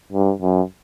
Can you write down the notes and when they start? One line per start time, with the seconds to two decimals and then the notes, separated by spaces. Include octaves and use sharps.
0.12 G2
0.42 F#2